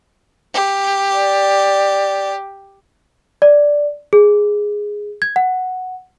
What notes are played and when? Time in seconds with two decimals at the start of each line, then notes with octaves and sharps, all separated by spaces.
0.54 G4
1.13 D5
3.42 D5
4.13 G#4
5.22 G#6
5.36 F#5